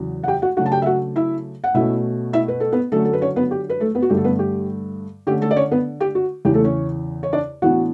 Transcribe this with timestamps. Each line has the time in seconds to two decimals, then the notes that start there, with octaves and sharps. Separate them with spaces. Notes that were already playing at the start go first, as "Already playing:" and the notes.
Already playing: E2 C#3 F#3
0.23 F#5
0.28 G4 G5
0.42 F#4 F#5
0.57 C#3 F#3 A3 D4 F#4 F#5
0.66 A5
0.72 G4 G5
0.82 E5
0.86 F#4 F#5
1.16 E4 E5
1.64 F#5
1.74 B2 A3 C#4 E4 E5
2.33 E4 E5
2.48 B4
2.60 A4
2.72 B3 B4
2.92 D3 F#3 A3 C#4 A4
3.04 A4
3.13 B4
3.21 C#4 C#5
3.36 B3 B4
3.51 G4
3.69 B4
3.80 A3 A4
3.95 B3 B4
4.02 F#4
4.09 G2 D3 A3 G4
4.17 A4
4.24 B3 B4
4.39 G4
5.27 D3 A3 C#4 G4
5.41 A3 A4
5.51 D5
5.56 C#4 C#5
5.71 B3 B4
6.00 G4
6.15 F#4
6.45 E2 C#3 E3 G4
6.54 A3 A4
6.64 C#4 C#5
7.23 C#5
7.32 D4 D5
7.62 A2 E3 B3 D4 F#4 F#5